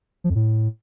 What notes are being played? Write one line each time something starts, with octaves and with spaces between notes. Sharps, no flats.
F3
F2
A2